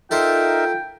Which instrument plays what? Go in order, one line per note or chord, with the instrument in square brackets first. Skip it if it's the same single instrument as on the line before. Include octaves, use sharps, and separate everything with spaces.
[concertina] D#4 A#4 E5 [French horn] F4 [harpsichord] A4 C5 [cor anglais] G5